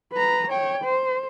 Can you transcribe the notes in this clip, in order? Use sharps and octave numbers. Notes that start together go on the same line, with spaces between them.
B4 A#5
C#5 G5
C5